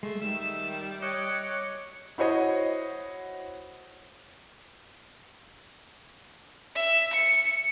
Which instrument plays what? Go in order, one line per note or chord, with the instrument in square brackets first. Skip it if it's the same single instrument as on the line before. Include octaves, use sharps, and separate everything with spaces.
[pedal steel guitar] G#3 [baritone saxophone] A3
[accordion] D#3 [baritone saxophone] G3 [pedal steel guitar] E5 [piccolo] E7
[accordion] C#5 D6 F#6 [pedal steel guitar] D#5 [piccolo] C#7
[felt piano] E4 F#4 C5 C#5 D#5
[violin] E5
C#7